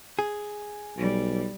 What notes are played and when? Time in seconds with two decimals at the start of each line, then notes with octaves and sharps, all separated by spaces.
0.19 G#4
0.97 B1 G3